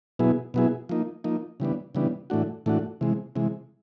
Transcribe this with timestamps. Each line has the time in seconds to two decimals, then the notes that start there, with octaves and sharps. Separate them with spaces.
0.19 B2 F#3 B3 E4 G#4
0.54 B2 F#3 B3 E4 G#4
0.89 F3 A#3 D#4
1.24 F3 A#3 D#4
1.60 C#3 E3 G3 B3 D4
1.95 C#3 E3 G3 B3 D4
2.30 A2 E3 A3 D4 F#4
2.66 A2 E3 A3 D4 F#4
3.01 C3 E3 G#3
3.36 C3 E3 G#3